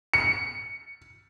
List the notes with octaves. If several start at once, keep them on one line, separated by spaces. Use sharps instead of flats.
C#7